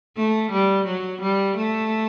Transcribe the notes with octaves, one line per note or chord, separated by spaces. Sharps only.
A3
G3
F#3
G3
A3